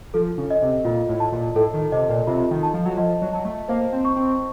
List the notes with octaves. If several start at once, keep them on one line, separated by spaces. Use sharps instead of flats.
F3 A4
C#3
D#5
C3
A#2 F4
A2
A5
A#2
A2 A4
D#3
C3 D#5
A#2
C3 F4
D#3
A5
F3
F#3
F3 D#5
F#3
F#3 A5
A3
A#3 C5
C4
C#6
C4